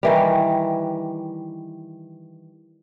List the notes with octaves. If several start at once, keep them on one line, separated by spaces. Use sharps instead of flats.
D#3 E3 G3